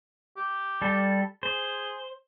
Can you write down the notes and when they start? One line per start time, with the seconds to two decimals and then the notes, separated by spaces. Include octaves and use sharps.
0.37 G4
0.82 G3 A4
1.43 G#4 C5